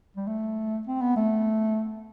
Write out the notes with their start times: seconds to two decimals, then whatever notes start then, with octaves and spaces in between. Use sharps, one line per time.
0.16 G3
0.27 A3
0.87 C4
1.01 B3
1.16 A3